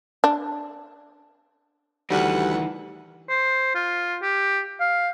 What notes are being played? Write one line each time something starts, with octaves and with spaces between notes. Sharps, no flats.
D4
D2 D#3 E3 G3 F#5
C5
F4
G4
F5